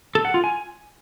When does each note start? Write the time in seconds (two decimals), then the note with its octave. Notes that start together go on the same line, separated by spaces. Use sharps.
0.15 A4
0.25 F#5
0.34 F4
0.44 G#5